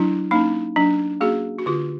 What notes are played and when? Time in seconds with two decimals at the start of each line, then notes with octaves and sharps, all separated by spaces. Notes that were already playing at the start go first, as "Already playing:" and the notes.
Already playing: F#3 D4 E4
0.31 A#3 C#4 D#4
0.76 F#3 D4
1.21 A#3 C#4 F#4 G#4
1.59 F#4
1.66 D3 F4 G4